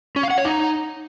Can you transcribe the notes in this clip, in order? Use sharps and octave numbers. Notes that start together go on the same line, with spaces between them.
C#4
F5
F#5
C#5
D#4